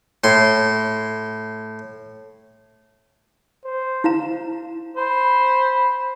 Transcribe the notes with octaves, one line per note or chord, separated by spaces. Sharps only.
A2 C6
C5
E4 F5 A#5
C5 B5